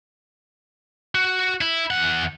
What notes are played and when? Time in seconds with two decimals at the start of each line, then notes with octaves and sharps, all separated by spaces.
1.15 F#4
1.61 E4
1.90 E2 F#5